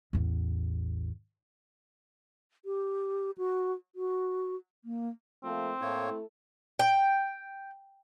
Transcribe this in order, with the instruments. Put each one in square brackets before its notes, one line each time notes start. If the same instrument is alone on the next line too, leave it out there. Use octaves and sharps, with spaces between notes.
[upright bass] A1 E2
[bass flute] G4
F#4
F#4
A#3
[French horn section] F3 A3 A#3 [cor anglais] C4
[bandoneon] A2 A#3 C#5 [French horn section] A3 E4 A4
[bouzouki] G5